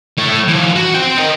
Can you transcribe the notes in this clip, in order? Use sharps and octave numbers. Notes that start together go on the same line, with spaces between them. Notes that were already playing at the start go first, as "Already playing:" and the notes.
A3 C#5
E3 F3
F#4
C4 G5
D#4 A#4